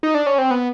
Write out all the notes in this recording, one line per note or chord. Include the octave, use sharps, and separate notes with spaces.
D#4
D4
C#4
C4
B3